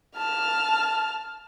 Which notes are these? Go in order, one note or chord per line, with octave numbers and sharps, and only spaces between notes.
A5 F6